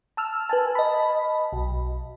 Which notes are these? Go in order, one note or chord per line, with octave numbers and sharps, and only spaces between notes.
A5 E6 F6
B4 G#5 A5
D#5 A5 B5
B1